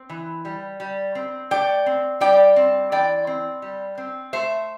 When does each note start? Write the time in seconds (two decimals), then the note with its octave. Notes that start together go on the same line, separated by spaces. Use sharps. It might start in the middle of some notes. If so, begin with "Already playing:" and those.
Already playing: C4
0.10 E3
0.45 G3
0.80 G3
1.15 C4
1.51 A3 D5 G5
1.86 C4
2.20 G3 D5 G5
2.56 C4
2.92 E3 D5 G5
3.27 C4
3.62 G3
3.98 C4
4.33 A3 C5 E5